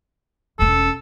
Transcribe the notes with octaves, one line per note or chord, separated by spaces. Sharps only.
E1 C#4 A4